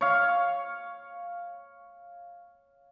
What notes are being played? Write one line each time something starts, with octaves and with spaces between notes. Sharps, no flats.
C#5 F5